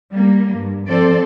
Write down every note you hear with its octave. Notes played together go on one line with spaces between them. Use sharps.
G3 A#3
G2
F3 C4 A4 C5 D5